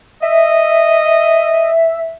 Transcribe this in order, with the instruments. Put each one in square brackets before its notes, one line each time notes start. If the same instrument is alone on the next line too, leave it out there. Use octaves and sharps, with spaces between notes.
[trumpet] D#5 [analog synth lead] E5